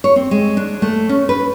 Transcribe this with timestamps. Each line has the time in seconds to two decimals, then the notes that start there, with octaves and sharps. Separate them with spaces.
0.04 C#5
0.16 C4
0.31 G#3
0.57 D4
0.82 A3
1.09 C#4
1.29 B4